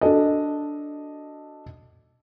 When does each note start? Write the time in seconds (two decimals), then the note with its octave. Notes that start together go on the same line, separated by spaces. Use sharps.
0.01 D4 F#4 A4 D#5